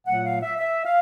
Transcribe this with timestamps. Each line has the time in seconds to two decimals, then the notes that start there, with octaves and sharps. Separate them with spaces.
0.06 A#2 F#3 A3 F#5
0.24 F5
0.42 E5
0.59 E5
0.86 F5